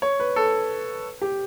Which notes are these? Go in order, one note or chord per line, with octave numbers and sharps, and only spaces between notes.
C#5
B4
A4
G4